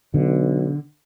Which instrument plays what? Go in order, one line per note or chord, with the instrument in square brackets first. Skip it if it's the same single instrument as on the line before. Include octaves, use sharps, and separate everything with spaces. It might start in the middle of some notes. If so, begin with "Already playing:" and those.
[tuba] B1 [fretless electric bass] D3